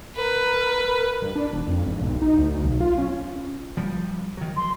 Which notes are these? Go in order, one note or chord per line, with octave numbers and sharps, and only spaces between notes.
A#4 B4
G2
D4
E1
F2
G#1
B1
D#4
D2
B1
F4
C#4
F3 G3
D#3 F#3
C6